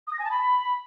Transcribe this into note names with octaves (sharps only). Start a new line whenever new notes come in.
D#6
A#6
G#5
A5
B5